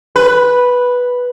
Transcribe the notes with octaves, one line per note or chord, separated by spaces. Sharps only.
B4